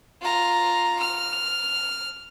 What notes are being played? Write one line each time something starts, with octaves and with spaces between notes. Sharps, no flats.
F4 A#5
F6